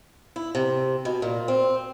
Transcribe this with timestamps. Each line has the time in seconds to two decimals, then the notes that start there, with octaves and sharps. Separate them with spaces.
0.36 E4
0.55 C3
1.05 B2
1.22 A#2
1.48 C4